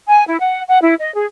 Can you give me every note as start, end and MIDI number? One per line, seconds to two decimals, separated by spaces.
0.08 0.24 80
0.27 0.38 64
0.40 0.62 78
0.68 0.78 78
0.82 0.94 64
1.00 1.13 75
1.15 1.26 68